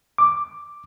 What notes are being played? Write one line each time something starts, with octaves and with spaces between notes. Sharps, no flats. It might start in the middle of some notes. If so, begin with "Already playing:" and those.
D6